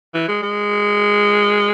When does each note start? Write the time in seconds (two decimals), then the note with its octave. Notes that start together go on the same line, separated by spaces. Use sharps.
0.14 E3
0.28 G#3
0.42 G#3